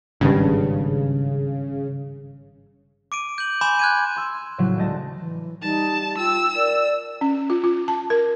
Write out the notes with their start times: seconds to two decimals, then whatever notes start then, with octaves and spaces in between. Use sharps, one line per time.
0.21 G#1 G2 C#3
3.12 D6 D7 D#7
3.38 G6 F#7
3.61 G#5 B5 C6 D6 G6 E7
3.79 F#6 G#6 D#7
4.16 C6 E6 G#6
4.58 A2 C#3 F3 F#3
4.77 D2 C#3 G#3 D#5 A5 A#6
5.15 E3
5.62 G3 D#4 A5
6.18 F4 G5 E6
6.56 A#4 D5
7.21 C#4
7.50 F4
7.64 F4
7.88 A5
8.10 A#4